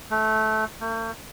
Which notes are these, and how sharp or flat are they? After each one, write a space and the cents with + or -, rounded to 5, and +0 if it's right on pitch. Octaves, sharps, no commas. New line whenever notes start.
A3 -15
A3 +45